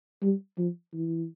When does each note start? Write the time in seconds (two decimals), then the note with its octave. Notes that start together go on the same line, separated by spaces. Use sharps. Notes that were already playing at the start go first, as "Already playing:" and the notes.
0.22 G3
0.58 F3
0.93 E3